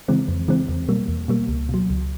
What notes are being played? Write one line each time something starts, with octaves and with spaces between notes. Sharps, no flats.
C#3 E3 G#3 C4
F2
C#3 E3 G#3 C4
E2
B2 G3 A#3
E2
B2 G3 A#3
C#2
B2 F#3
C#2